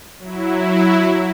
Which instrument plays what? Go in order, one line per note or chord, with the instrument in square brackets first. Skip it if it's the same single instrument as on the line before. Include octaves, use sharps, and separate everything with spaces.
[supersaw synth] F#3 E4